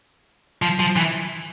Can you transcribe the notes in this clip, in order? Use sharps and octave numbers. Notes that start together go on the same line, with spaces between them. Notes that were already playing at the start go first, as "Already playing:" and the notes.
F3
F3
E3